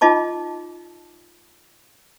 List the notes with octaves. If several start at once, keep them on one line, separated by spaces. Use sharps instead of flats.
D#4 F4 D#5 A5 D6